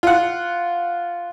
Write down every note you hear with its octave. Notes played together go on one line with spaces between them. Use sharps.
F4 F#5